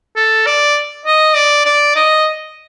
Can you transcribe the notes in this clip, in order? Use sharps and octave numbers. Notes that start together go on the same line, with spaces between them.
A4
D5
D#5
D5
D5
D#5